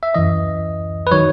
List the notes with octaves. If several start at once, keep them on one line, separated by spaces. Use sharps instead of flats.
E5
F#2 E3 D#5
B4
D#3 F#3 C#5